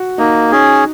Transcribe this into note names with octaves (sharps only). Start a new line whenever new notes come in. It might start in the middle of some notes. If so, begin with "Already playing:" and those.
Already playing: F#4
A#3 D#4
C#4 D#4 G#4